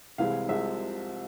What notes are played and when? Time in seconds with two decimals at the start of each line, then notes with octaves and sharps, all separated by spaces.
0.18 C2 C3 E3 G#3 F5
0.48 C2 C3 F3 G#3 E5